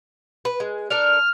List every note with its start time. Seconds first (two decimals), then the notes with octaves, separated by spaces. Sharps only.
0.45 B4
0.60 G#3
0.90 D4 A4 A#4 F6